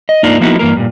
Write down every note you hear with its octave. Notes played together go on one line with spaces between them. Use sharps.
D#5
G#2 A#3 D4 D#4 F4
F3 A#3 B3 D#4 E4 F#4
G2 E3 A#3 A#4
G2 A#2